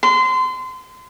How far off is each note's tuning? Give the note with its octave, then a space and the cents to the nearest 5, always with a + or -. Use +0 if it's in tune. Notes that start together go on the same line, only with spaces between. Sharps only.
C6 -30